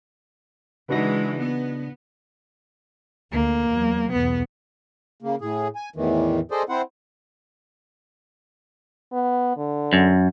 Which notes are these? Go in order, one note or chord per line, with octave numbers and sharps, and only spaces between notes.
C#3 E3 G#3 D4 D#4 F#4 B4 A#6
B3
D2 A#3
E2 F#3
B1 E2 B3
C#3 A#3
A2 G#4
G#5
E2 A2 D#3 E3
G#4 A4 C5 D5 D#5
C4 E4 C5 F#5
B3
D3
F#2